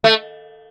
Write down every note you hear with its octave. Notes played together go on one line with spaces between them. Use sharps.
A3